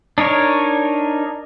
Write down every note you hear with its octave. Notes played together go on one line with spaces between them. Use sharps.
D4 D#4 A#4 C#5